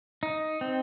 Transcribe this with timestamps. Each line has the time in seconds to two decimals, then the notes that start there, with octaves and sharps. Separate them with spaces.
0.23 D#4
0.61 C4